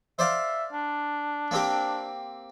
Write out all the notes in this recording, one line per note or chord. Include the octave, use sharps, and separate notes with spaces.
C5 D5 E5 F5
D4
A#3 C4 G4